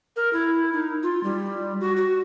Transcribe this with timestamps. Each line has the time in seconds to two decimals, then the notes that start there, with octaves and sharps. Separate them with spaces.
0.16 A#4
0.33 E4
0.73 D#4
1.03 F4
1.24 G3
1.81 F#4
1.97 F#4